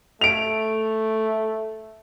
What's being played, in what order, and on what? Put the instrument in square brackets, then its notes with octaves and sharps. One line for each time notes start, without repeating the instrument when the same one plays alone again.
[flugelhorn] A3 [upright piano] D7 F7